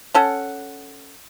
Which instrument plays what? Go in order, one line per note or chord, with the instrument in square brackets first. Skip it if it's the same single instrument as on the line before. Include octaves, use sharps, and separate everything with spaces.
[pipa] C#4 A4 F#5